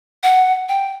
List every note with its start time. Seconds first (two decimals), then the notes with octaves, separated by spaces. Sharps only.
0.23 F#5
0.69 G5